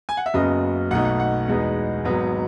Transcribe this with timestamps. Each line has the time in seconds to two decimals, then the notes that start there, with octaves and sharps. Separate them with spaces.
0.09 G#5
0.17 F#5
0.26 E5
0.34 F#1 F#2 C#3 F#3 B3 D#5
0.91 B1 B2 A3 D#4 F#5
1.05 F#5
1.20 F#5
1.48 E2 B2 G#3 B3 D#4
2.05 G#1 G#2 F#3 B3 D#4